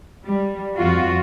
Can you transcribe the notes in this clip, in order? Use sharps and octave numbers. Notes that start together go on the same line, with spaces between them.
G3
F2 F4 F#4